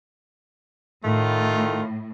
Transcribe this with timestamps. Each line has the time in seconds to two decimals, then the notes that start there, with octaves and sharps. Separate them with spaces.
1.03 A2 D#3 A3 F4